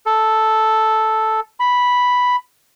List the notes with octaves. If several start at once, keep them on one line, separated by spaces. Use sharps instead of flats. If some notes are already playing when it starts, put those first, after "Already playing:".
A4
B5